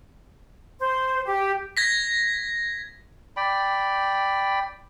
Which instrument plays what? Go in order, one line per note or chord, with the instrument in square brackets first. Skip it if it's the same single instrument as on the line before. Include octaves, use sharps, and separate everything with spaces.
[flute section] C5
G4
[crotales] G#6 A#6 B6
[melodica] D5 G5 B5